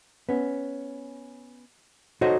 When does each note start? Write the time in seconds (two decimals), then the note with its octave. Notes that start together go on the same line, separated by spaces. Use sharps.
0.29 B3 C#4
2.21 D#4 F#4 A4 C5 C#5 D#5